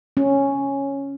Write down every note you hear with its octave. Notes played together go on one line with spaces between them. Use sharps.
C#4